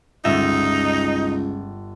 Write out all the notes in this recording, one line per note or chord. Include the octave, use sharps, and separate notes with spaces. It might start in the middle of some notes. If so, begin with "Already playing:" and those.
G1 C#2 D#4 E5 A#6